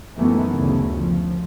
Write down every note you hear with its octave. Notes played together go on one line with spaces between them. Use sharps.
F#2 D#3 E3 A3 B3
D2 C#3
F3